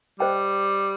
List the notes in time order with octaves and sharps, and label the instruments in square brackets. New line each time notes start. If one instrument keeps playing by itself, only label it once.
[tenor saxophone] G3 [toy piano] C5 D#5 G5